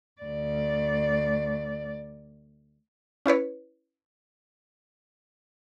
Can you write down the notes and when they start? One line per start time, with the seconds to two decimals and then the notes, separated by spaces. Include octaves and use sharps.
0.21 D2 D5
3.26 C#4 E4 B4 C#5